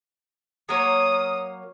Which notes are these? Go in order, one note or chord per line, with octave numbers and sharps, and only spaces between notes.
F#3 A#3 C#5 D#6